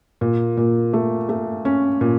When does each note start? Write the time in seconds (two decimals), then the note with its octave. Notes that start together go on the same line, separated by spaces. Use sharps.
0.21 A#2
0.57 A#2
0.93 A3
1.29 A3
1.65 C#4
2.01 A#2